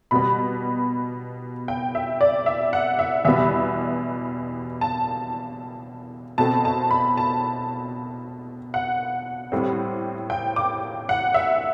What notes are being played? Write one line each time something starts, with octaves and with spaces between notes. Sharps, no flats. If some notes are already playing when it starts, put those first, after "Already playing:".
B2 G3 B3 B5
G5
E5
D5
E5
F#5
E5
E2 B2 G3 B3 E5
A5
B2 A3 C4 A5
A5
B5
A5
F#5
A2 G3 C4
G5
D6
F#5
E5